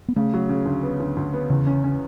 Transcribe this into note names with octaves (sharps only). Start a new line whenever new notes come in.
B3
C#3 A3
F#3
C#3
D2
B3
D2
D2
B3
E2 C#3
C#4
C#4